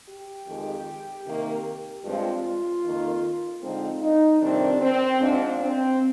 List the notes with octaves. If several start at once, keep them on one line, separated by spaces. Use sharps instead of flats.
G4
F2 D#3 G#3
C3 D#3 A#3
G2 F3 G#3 C4 F4
F2 D#3 A#3
D3 F3 G#3 C4 D#4
D#4
F2 C3 D#3 G3 C4 D4
C4
G#2 F3 C4 D4
C4